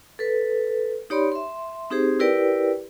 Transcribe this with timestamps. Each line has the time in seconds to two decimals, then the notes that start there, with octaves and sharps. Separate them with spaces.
0.19 A4 B4
1.10 D#4 G4 C#5 D5 B5 C6
1.32 E5 C6
1.90 C4 D#4 G4 G#4 C5
2.20 E4 G4 A#4 B4 D5 G5